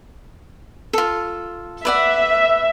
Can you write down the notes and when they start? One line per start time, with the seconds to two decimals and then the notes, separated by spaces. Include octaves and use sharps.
0.93 F4 A4
1.85 B4 D5 E5 F#5